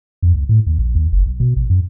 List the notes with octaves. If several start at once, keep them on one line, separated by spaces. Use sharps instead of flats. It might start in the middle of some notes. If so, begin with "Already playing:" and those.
F2
C#2
A2
D#2
A#1
D#2
F#1
B1
B2
A#1
F#2